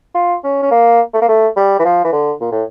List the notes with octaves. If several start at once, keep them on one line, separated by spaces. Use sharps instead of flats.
F4
C#4
C#4
A#3
A3
A#3
A3
G3
E3
F3
E3
D3
A#2
A2